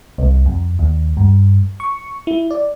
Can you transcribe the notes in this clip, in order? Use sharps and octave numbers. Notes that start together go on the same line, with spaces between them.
C2
F2
D#2
G2
C#6
E4
D5